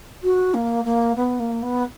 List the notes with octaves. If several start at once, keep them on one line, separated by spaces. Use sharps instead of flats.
F#4
A#3
A#3
B3
A#3
B3